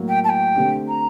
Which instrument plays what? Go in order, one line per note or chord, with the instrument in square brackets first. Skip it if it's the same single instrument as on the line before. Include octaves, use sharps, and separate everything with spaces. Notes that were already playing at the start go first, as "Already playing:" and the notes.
Already playing: [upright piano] A2 F#3 A#3
[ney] G5
A5
G5
[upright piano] D3 A3 C4 G4
[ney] A#5